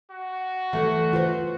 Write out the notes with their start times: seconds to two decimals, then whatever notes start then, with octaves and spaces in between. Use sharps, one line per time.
0.11 F#4
0.73 E3 G3 A3
1.13 F4 B4 C5